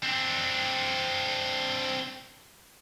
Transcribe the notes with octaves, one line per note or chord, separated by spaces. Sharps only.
C4 D4